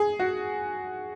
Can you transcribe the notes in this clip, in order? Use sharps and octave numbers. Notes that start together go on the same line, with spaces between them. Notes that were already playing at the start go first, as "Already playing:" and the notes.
Already playing: G#4
F#4